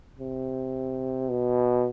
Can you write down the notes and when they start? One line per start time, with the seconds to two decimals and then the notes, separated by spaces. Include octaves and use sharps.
0.19 C3
1.30 B2